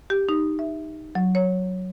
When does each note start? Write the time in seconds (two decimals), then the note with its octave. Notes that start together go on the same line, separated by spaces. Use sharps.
0.10 G4
0.29 D#4
0.59 E5
1.15 F#3
1.35 C#5